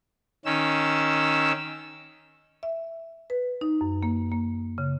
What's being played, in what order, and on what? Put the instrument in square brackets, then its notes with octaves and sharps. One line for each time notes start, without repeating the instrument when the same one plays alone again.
[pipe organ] D#3 C#4 E6
[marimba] E5
B4
D#4
F#2
A#3
A#3
C#3